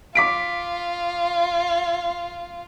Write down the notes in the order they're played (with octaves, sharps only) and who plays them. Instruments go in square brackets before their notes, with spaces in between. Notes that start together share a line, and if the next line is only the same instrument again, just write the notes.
[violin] F4 [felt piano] D6 B6 D7